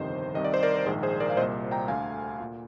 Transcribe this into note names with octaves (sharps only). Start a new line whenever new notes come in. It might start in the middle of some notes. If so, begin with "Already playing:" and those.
Already playing: G1 F2 C3 D#3 C5 D#5
C2 C3 D#3 D#5
D5
C5
A#4 D5
A#4
A#1 G#2 D#3 G#4 C5
G#4 C5
A#4 D5
F5
C2 A#2 C5 D#5
G5 A#5
D2 D3 F5 G#5
A#2